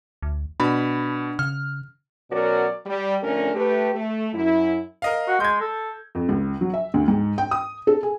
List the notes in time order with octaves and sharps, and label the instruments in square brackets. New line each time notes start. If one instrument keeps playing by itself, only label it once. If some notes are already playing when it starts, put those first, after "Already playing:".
[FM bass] D2
[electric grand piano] B2 B5 [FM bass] D4
[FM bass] C#3 [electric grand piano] F6
[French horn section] B2 F#3 C#4 F#4 A#4 D5
G3
F2 D3 A3 C#4 D4 A#4
A3 G4 B4
A3
F#2 E4
[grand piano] A#4 D#5 F5
[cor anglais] F#4
[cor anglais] G#3 [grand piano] G6 G#6
[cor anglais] A4
[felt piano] F2
C#2
F#3
E5
D2
G#2
G5
D#6
A4
G#4